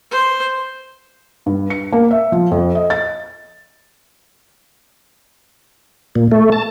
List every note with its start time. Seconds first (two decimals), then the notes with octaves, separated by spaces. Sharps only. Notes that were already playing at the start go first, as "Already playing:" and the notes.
0.11 C5
1.46 G2
1.70 C#7
1.92 A#3
2.11 E5
2.32 F3
2.51 F2
2.75 D#5
2.90 A6
6.15 A#2
6.32 A3
6.52 A5